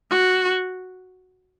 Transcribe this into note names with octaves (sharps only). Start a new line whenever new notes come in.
F#4